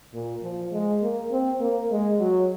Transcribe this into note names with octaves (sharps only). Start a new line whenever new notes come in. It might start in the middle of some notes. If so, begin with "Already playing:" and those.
A#2
F3
G#3
A#3
C4
A#3
G#3
F#3